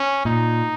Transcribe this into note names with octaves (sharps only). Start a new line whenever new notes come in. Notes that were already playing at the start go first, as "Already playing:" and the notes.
Already playing: C#4
A#2 D#4